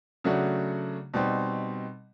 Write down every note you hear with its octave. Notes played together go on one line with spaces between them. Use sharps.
C#3 F#3 A3 D4 F#4
B2 G3 C4 D#4